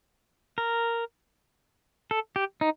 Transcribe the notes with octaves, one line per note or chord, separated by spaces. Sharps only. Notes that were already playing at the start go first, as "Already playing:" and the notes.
A#4
A4
G4
D#4